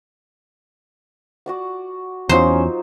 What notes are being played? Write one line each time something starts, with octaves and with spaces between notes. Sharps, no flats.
F#4 D5 F#5
E2 F#3 C#4 D#4 F4 C5